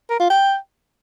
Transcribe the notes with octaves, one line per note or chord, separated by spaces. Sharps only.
A#4
F4
G5